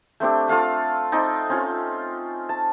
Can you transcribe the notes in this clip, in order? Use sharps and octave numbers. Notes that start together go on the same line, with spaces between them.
A3 C4 D4 G4
F4 A4 F5 F#5
C4 D#4 D5
C4 C#4 F4
A5